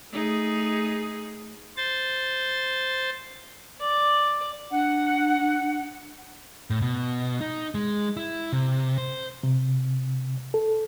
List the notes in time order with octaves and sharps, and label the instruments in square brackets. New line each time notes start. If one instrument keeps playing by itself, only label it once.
[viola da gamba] A3 D#4 G#4
[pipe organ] C5 A6
[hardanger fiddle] D5
[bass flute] D4 [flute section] F#5
[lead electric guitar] A2
B2
D#4
G#3
E4
C3
C5
[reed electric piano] C3
A4